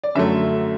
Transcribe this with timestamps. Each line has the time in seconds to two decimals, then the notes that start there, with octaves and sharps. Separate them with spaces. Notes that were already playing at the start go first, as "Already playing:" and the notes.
0.04 D5
0.15 F#2 D3 F#3 A3 E5